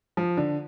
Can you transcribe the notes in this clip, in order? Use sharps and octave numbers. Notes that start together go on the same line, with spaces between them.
F3
D3